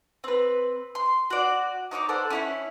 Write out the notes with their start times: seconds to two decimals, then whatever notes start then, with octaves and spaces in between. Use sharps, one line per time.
0.24 C4 B4
0.95 C6
1.30 F#4 D5
1.91 D#4 C#5 C#6 D6
2.09 A4 C5 D5 F#5
2.30 C#4 E4 C#5